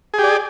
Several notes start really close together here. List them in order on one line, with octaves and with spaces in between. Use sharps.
G#4 G4 D5